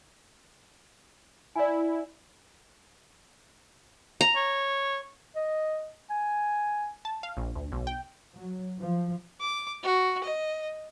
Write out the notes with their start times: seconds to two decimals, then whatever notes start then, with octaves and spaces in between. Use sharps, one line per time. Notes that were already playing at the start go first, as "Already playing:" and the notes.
1.56 E4 D5 G#5
4.21 A#5
4.36 C#5
5.36 D#5
6.11 G#5
7.05 A5
7.23 F5
7.37 A#1
7.56 D2
7.72 B1
7.87 G5
8.34 F#3
8.79 F3
9.41 D6
9.83 F#4
10.24 D#5